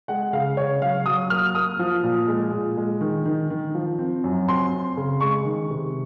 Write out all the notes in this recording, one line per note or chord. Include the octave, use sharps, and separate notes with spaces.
G#3 F#5
C#3 F5
C#3 C#5
F#3 F5
F#3 D#6
A#3 F6
A#3 D#6
F3
A#2
G#3
A#2
G#3
D#3
D#3
D#3
F3
C4
F#2
C4 C6
C4
C#3
G#3 C#6
D#3
C3